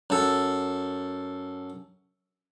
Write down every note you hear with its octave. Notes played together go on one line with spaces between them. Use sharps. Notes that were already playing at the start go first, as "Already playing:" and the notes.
F#2 A4